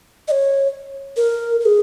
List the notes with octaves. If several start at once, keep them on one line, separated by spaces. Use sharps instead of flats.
D#5
C#5
A#4
A#4
G#4